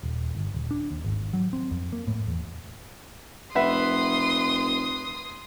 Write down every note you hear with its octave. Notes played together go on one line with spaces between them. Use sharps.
D#1
G1
D#1
D4
D#2
G#1
F#3
C4
F2
A#3
A2
E2
F1 B4 E5 F#5 C6 D#6